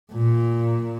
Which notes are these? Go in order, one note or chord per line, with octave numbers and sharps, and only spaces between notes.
A#2